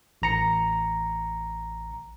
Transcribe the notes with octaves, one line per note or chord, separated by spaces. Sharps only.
A1 A#5 C#7